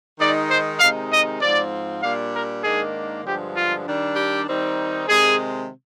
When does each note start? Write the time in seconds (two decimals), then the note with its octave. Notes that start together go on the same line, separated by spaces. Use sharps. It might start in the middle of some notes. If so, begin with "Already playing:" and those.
0.19 D#3 G#3 D#4 D5
0.50 C5
0.80 C3 D#3 G#3 D#4 F5
1.11 D#5
1.41 G#2 F3 C4 D5
2.03 A#2 G3 D4 F5
2.34 A#4
2.64 G#2 D#3 A#3 D4 G#4
3.24 G2 D3 F3 G#3 G4
3.55 F4
3.86 D#3 G3 D4
4.16 G4
4.47 D#3 G3 C4 D#4
5.08 C3 D#3 G#3 G#4